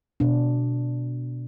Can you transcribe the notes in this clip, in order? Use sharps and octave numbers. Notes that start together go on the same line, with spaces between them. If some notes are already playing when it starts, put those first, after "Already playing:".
B2 D4